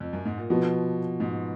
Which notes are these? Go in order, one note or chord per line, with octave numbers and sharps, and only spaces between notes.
F2
F#2
G#2
A#2
B2 F3 B3 F#4
G#2